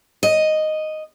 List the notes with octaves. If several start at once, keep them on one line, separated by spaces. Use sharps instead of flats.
D#5